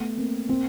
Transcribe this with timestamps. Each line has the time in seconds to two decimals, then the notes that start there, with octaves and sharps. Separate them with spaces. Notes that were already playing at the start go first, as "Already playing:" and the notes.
Already playing: A3 B3
0.17 A#3 C4
0.49 A#3 C4